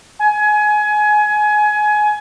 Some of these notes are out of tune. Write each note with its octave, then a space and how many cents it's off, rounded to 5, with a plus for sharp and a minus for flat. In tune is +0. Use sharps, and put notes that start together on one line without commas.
G#5 +20